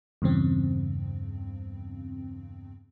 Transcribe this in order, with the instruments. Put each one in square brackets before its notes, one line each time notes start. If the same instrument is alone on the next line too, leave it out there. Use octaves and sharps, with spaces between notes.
[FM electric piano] E2 G2 C#3 C4